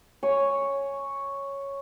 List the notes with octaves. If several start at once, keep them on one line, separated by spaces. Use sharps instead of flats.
C#5 G#5